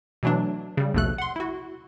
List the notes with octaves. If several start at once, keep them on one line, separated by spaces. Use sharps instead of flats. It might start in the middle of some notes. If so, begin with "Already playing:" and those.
B2 E3 F#3 A3 D4
C#3 G3
A#1 D#2 B2 A3 A4 F#6
F#5 C6
E4 F#4